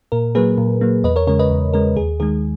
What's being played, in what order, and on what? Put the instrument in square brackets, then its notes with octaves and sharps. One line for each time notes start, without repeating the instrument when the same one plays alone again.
[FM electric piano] A#2 A#4
F#3 A#3 G#4 B4
A#2
F#3 A#3
E2 B4 D#5
A#4 C#5
C#3 G#3 A#4 C#5
B4 D#5
E2
C#3 G#3 A#4
D#2 G#4
D#3 G#3 G#4